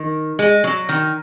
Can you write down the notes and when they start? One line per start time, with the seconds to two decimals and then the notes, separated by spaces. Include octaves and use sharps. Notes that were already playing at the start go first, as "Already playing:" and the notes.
Already playing: D#3
0.39 G#3
0.64 F#3
0.89 D#3